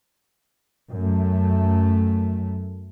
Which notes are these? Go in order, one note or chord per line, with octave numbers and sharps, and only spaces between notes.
F#2 A3